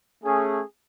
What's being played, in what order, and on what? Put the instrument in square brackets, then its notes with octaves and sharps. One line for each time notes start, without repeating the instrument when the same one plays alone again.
[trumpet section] A3 C#4 G#4